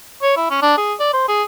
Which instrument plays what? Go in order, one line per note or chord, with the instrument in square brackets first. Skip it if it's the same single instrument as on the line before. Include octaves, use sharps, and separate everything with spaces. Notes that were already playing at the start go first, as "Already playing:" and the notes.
[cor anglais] C#5
E4
C#4
D4
G#4
D5
C5
G#4